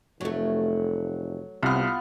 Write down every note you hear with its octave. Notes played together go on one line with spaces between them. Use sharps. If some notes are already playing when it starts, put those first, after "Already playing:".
F1 F#3 A3
C2 C3 B3 F4 F6